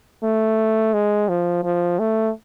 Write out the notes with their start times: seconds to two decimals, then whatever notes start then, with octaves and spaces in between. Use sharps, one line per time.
0.24 A3
0.94 G#3
1.29 F3
1.64 F3
1.99 A3